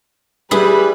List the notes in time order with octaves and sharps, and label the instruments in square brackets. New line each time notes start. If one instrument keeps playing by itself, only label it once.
[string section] G3 B4 [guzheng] E4 G#4